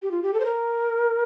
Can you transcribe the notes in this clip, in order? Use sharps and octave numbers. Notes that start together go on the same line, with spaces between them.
G4
F4
G4
A4
C5
A#4